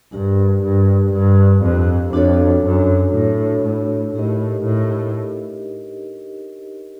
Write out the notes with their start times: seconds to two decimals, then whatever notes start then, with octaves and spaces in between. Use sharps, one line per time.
0.12 G2 D4 G4 A#4
0.63 G2
1.13 G2
1.63 F2
2.13 F2 D4 F#4 A4 C#5
2.63 F#2
3.14 A2
3.64 A2
4.14 A2 D#4 G4 A#4 D#5
4.65 A2